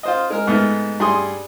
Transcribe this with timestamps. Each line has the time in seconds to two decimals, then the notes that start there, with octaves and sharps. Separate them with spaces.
0.03 F4 C5 D#5
0.30 G#3 A#4
0.47 G#2 A3 B3 F6
1.00 G2 G#4 G#5 C6 D#6